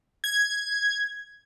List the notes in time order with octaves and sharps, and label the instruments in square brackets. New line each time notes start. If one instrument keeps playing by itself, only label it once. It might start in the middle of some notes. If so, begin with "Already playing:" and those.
[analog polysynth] G#6